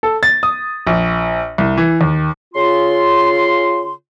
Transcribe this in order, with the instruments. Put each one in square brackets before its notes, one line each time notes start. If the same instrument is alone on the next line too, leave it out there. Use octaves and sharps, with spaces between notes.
[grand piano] A4
A6
D#6
A#1
C2
E3
D#2
[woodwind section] C#3 F4 C6